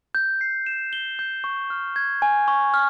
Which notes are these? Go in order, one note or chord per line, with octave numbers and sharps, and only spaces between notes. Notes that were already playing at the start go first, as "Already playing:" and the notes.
G6
C7
E7
G7
G6
C#6
F6
G#6
G#5
C#6
F6